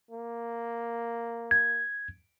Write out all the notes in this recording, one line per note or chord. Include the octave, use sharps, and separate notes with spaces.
A#3
G#6